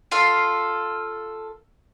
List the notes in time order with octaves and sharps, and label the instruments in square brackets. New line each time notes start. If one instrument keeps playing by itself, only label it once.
[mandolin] F4 A4 F5